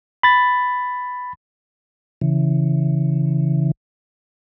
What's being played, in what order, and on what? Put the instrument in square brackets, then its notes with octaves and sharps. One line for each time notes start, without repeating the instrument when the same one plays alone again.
[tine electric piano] B5 A6
[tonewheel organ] C#3 E3